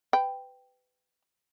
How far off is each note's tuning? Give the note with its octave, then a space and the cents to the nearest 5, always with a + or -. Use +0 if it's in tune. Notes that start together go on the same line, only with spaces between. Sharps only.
B4 +25 G5 +0